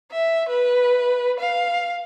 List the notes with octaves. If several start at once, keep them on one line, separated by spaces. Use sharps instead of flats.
E5
B4
F5